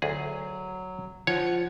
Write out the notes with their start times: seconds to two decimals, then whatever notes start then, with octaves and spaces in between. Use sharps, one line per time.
0.02 D2 F#3 G#4
1.27 F3 C#5 F#5